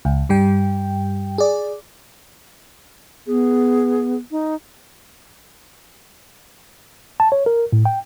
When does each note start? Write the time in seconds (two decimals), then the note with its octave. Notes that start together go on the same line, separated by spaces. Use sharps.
0.05 C#2
0.29 G2 G3 G5
1.38 G#4 D5
3.27 B3 G#4
4.31 D#4
7.20 A5
7.32 C#5
7.46 A#4
7.72 A2
7.85 G5